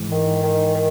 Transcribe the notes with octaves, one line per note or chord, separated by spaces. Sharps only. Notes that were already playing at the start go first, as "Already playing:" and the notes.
Already playing: G#2 E3
D#3
D#3
D#3